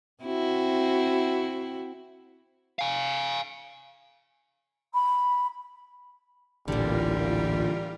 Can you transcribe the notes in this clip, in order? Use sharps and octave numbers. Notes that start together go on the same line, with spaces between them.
C4 E4 F#4
F5 G#5
B5
A1 D2 A#2 D3 E3 G3 F4 A#4